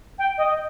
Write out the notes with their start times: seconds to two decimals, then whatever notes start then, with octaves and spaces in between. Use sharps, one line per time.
0.19 G5
0.38 D#5